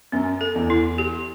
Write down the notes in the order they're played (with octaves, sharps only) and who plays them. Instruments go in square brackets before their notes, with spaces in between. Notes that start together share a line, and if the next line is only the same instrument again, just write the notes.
[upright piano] F#2 [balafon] B3
[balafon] A4
[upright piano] E2
[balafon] E4
G4